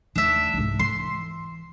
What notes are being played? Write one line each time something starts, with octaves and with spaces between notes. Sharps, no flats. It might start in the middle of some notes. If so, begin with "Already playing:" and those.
D#2 A3 D4 E5
C2 G#2
E3 C6